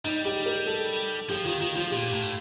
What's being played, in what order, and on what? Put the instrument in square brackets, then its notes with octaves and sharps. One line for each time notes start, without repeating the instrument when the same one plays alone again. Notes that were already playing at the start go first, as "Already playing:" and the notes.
[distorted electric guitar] G3 [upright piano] D#4
[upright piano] G4
A#4
A4
[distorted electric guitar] F3 [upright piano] G4
[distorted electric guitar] D#3 [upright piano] F4
[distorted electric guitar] D#3 [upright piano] F4
[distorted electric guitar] F3 [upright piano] F4
[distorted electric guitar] A#2 [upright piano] G4
[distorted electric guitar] A2